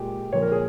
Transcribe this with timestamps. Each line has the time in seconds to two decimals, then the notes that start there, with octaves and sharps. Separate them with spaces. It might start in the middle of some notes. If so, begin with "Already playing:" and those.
Already playing: A#2 G#3 G4
0.33 A#2 F3 A#3 C#5
0.42 A#4
0.52 G#4